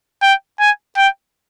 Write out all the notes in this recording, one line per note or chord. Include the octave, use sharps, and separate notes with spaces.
G5
G#5
G5